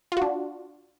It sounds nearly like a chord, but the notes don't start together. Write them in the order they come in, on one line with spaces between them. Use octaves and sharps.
F4 F#4 D4